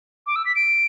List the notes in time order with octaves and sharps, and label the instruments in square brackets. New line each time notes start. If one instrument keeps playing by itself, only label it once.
[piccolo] D6
E6
B6
D7